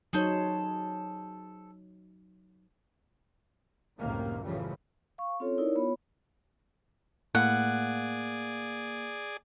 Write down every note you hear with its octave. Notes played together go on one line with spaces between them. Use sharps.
F#3 D#4 G#4 A4 C5 C#5
C#2 F#2 A2 C3 D#3 A#3
A1 C#3 E3 F3 G3
F5 C#6
C4 C#4 F4 A4 C#5
D#4 E4 A#4 C#5 D5
B3 F4 C#5 B5
A2 A#3 G#4 D5 F#5